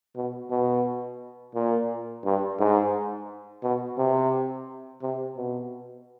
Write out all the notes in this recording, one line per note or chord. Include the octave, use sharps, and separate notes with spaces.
B2
B2
A#2
G2
G#2
B2
C3
C3
B2